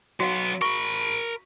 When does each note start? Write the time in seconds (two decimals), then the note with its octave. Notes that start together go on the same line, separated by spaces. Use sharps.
0.20 F#3 B3 F#4 D#5 F5
0.62 A#4 B5 C#6